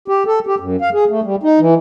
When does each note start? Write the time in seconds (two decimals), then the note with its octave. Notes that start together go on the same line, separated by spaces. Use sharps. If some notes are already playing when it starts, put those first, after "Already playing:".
0.08 G4
0.26 A4
0.47 G4
0.60 F#2
0.81 F5
0.94 G#4
1.09 A3
1.24 G3
1.43 D#4
1.60 E3